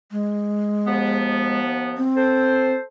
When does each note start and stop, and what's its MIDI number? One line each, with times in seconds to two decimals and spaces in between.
0.12 1.59 56
0.86 2.06 39
0.86 2.06 53
0.86 2.06 59
1.97 2.73 60
2.16 2.82 69
2.16 2.82 72